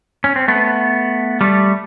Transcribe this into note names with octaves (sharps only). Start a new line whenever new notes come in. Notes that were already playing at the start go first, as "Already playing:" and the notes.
C#4
C4
A3 B3
G3 A3